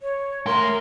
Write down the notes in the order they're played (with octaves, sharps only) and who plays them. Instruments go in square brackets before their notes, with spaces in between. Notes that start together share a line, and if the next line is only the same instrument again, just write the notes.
[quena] C#5
[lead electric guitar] A3 C6 [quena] A#4